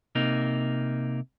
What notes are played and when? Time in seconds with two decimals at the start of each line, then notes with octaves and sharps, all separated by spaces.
0.15 C3 A#3 D#4